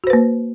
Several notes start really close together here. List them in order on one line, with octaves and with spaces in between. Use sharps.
F#4 C5 B4 A#3